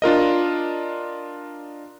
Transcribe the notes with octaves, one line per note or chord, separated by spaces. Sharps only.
D4 F4 A#4 D#5